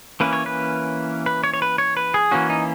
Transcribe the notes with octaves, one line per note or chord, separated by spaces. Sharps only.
E3 A#3 C#4 B4
C#5
B4
B4
C#5
C#5
B4
C#5
B4
G#4
E3 A#3 C#4 F#4
D#4